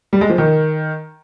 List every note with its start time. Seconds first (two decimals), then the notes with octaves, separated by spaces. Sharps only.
0.13 G3
0.21 G#3
0.30 F3
0.38 D#3